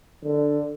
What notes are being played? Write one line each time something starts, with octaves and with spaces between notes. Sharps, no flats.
D3